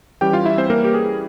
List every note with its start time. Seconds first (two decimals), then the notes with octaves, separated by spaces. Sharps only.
0.21 E3 G3 C#4 G4 G5
0.33 F4 F5
0.45 E4 E5
0.58 C4 C5
0.70 A#3 A#4
0.84 G4
0.94 G#4